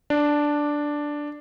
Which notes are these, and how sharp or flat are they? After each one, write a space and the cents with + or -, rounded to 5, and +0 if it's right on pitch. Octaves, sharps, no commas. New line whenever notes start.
D4 +0